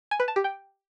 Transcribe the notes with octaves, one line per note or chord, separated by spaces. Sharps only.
G#5
B4
A5
G4
G5